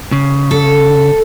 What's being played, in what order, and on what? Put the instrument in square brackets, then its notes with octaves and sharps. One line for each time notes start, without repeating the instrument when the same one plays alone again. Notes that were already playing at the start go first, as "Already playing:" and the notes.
[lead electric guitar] C#3
[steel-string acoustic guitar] A4